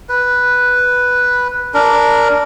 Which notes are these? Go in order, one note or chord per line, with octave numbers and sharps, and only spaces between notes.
B4
D4 A#4